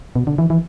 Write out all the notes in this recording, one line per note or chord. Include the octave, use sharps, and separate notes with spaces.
B2
D3
E3
E3